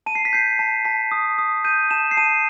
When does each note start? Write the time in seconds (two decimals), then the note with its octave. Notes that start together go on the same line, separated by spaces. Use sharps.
0.06 A5 D#7
0.15 C7
0.25 B6
0.33 G6 C7
0.59 A5
0.85 A5 B6
1.11 D#6
1.38 D#6
1.64 G6 D#7
1.91 A5 E7
2.11 C7
2.17 A5 D#7